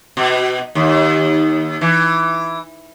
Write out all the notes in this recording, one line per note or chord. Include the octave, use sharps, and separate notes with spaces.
B2
D#2
E3